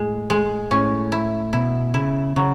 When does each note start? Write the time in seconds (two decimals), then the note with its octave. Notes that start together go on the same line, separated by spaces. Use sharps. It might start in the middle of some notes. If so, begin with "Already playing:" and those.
Already playing: A2 G#3
0.30 G#3
0.71 A2 C#4
1.12 E4
1.53 B2 E4
1.94 C#3 E4
2.36 C#3 F#3